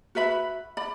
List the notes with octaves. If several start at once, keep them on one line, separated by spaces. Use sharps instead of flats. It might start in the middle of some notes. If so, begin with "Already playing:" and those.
F#4 B4 E5 B5
D5 B5